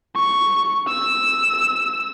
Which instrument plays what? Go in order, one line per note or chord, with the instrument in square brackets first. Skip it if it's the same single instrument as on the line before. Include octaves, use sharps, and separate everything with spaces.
[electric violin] C#6
E6